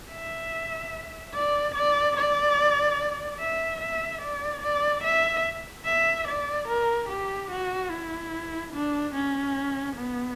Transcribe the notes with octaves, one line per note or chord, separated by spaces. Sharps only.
E5
D5
D5
D5
E5
E5
D5
D5
E5
E5
D5
A#4
G4
F#4
E4
D4
C#4
B3